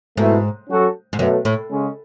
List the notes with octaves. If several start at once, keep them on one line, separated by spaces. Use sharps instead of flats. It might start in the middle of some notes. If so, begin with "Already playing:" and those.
G#2 B2 A3 E4
F#3 C#4 F#4 A4
G#2
F#2 B2 F#3 A3
A2
C#3 G#3 C#4 G#4